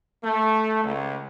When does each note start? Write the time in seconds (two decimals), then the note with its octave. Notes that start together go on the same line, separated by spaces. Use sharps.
0.23 A3
0.84 C#2